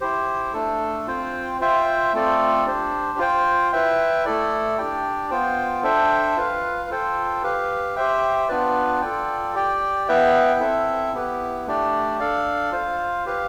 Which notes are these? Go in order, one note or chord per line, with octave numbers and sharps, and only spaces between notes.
E4 G4 C5
A3 D4 A4
C4 F4 C5 G5
F4 C5 E5 G5
A3 C4 F4 A4 D5
D4 G4 C5
F4 C5 G5
E4 B4 E5 G5
A3 E4 A4 D5
D4 G4 D5 G5
B3 F4 C5 G5
D4 A4 C5 E5 G5
F4 B4 F5
F4 A4 C5 G5
G4 B4 F5
G4 C5 E5 G5
B3 D4 F4 B4 D5
F4 A4 D5 G5
G4 D5 G5
B3 E4 B4 E5 G5
C4 E4 A4 E5
B3 E4 G4 B4
A3 D4 G4 D5
D4 A4 D5 F5
F4 C5 F5
G4 B4 F5